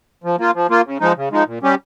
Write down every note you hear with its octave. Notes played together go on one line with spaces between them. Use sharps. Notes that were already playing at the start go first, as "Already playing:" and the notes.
F3
A#3 F4
F3
A#3 F4
C#3
F3 G#3 D#4
C#3
F3 G#3 D#4
A#2
G3 C#4 G4